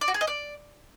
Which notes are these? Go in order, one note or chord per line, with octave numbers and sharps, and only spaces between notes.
D5
F#4
G#4
D#5
D5